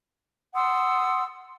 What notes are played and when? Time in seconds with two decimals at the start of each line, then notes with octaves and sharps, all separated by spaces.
0.54 F#5 C6 D#6 E6